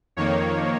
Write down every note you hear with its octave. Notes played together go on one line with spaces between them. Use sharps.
F2 D#3 A#3 C#5